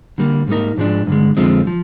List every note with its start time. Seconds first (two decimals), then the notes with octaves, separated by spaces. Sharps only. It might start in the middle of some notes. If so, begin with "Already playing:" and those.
0.18 D3 G3 A#3
0.47 G#2 G3 A#3 D#4 A#4
0.78 G#2 F3 G#3 D4
1.07 G2 D3 G#3
1.37 F2 D3 F3 G#3 C4
1.67 F3